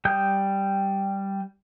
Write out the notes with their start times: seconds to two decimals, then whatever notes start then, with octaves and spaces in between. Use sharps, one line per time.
0.05 G3 G5 D#6 G6